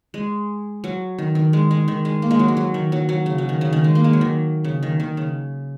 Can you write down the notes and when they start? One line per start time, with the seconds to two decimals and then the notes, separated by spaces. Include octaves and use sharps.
0.14 G#3
0.84 F#3
1.18 D#3
1.35 D#3
1.53 G#3
1.71 G#3
1.88 D#3
2.05 G#3
2.22 A#3
2.31 G#3
2.39 F#3
2.48 G#3
2.57 F#3
2.74 D#3
2.92 F#3
3.09 F#3
3.26 C#3
3.38 F#3
3.49 D#3
3.61 C#3
3.73 D#3
3.84 G#3
3.95 A#3
4.04 G#3
4.13 F#3
4.21 D#3
4.64 C#3
4.83 D#3
5.00 D#3
5.17 C#3